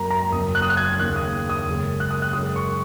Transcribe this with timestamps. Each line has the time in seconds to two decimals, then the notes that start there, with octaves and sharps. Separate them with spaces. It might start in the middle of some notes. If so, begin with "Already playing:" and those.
Already playing: F#2 F#3 A#3 A#5
0.10 A#5
0.32 F#1 F#2 F#3 D#6
0.55 F#6
0.62 D#6
0.70 F#6
0.77 G#6
0.99 D#2 C#3 A#3 F#6
1.16 D#6
1.49 D#6
1.67 F#1 F#2 C#3 G#3
2.00 F#6
2.11 D#6
2.22 F#6
2.33 F#2 C#3 G#3 D#6
2.56 C#6